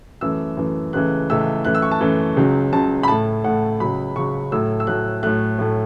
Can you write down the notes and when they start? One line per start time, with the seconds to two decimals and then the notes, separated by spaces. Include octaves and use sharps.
0.21 F#2 E3 A3 E6
0.57 F#2 E3 A3
0.93 C#2 C#3 E3 A3 F#6
1.30 C#2 C#3 E3 A3 E6
1.65 F#2 E3 A3 F#6
1.75 E6
1.82 C#6
1.91 A5
2.01 F#2 E3 A3
2.37 C#2 C#3 F#3
2.72 C#2 C#3 F#3 A5
3.03 B5
3.08 A2 A3 A5
3.44 A2 A3 F#5
3.80 C#2 C#3 F#3 B5
4.16 C#2 C#3 F#3 C#6
4.52 A2 F#3 A3 E6
4.80 E6
4.87 A2 F#3 A3 F#6
5.23 A2 F#3 A3 F#6
5.59 A2 F#3 A3